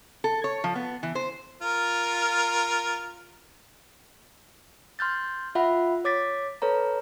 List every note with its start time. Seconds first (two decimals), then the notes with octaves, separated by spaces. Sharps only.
0.24 A4
0.44 C#5
0.64 F3
0.75 B3
1.03 E3
1.15 C5
1.62 F4 A#4
4.99 C6 F6 G6 A6
5.55 F4 E5 F#5 B5
6.05 C#5 D6 A6 B6
6.62 A4 B4 C#5 A#5